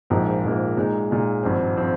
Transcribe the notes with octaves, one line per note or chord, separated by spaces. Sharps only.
A#1 G#2 F3 A#3
A#1 G#2 F3 A#3
A#2 G#3 D#4
A#2 G#3 D#4
G#1 G2 F3 C4
F3 C4